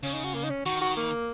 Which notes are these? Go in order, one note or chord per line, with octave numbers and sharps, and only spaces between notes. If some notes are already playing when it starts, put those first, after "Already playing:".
C#3 C#4
D#4
F#4
A#3
D#4
C#4
D#3 F#4
F#4
A#3